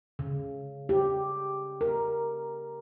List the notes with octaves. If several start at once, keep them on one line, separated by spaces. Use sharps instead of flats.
C#3
G4
A#4